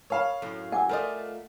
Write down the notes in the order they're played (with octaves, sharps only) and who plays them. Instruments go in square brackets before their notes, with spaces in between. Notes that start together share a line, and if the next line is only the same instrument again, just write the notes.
[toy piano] A#4 B5 [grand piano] C#5 F5
[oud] F#2 A2
[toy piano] F#5 D6 E6 [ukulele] G#5
[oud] A3 F4 D#5 [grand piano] A#4 D5